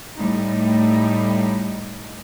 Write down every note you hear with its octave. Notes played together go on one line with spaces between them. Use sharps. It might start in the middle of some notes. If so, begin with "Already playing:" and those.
A2 G3 D#4